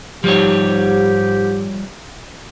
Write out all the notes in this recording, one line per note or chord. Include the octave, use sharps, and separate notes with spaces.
G#2 F3 G3 G4 C#5